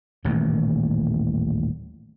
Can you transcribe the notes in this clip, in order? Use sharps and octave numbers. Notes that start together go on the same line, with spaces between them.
D#1 A1 D#2 E3